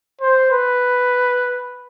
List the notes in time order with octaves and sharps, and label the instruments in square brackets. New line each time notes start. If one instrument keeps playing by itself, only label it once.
[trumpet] C5
B4